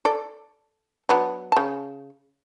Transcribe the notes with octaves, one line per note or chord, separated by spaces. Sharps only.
A4 D5
F#3 B3 D4
C#3 A5